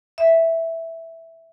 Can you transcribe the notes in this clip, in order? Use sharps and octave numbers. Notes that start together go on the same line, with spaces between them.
E5